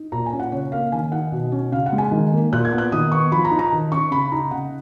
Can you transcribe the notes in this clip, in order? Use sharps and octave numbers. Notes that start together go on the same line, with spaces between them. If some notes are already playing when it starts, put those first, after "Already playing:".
Already playing: D#4
A#2 A#5
G#5
C#4
F#5
C#3 C#5
A#3 F5
D#3 G#5
D#4 F#5
B2
C#4
C#3 F5
F#5
G#3
G#5
D#3
A#3
A#2 F#6
G#6
B3
F#6
D#3 D#6
B3 C#6
F3 B5
A#5
D#4
A#5
D#3
C#4 C#6
C#3 B5
D#4 A#5
C#3 F#5